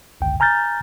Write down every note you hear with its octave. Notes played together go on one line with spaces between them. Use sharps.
G#1 C#2 F#2 D3 G5
G#5 A#5 F6 G6 A6